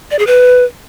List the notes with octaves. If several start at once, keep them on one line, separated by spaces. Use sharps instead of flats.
D5
G#4
B4